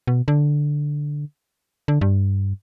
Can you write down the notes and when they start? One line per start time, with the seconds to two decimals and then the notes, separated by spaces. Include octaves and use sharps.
0.07 B2
0.28 D3
1.88 D3
2.01 G2